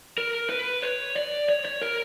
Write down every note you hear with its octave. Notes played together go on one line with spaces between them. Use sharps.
A#4
B4
C#5
D5
C#5
C#5
A#4